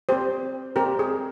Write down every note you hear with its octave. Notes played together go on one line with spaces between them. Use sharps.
C4 G4 C5
C4 G4 A#4
G#4